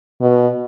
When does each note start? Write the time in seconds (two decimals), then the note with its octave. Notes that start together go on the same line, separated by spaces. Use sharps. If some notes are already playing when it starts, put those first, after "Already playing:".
0.21 B2